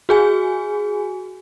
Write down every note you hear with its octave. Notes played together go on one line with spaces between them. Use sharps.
F#4 G#4 G#5